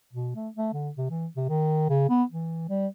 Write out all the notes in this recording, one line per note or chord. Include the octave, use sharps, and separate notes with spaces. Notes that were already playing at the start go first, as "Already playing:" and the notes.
B2
A3
A3
D3
C3
E3
C3
D#3
C#3
B3
E3
G3